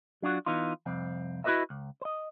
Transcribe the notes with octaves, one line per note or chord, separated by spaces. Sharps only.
F#3 D4 F4 F#4
E3 B3 D#4 F4
C2 F2 C4
E4 F#4 G4 B4 D#5 E5
C#2
C5 D#5